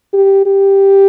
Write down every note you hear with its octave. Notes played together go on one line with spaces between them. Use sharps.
G4
G4